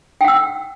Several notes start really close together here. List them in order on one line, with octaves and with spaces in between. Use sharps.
G5 F#5 E6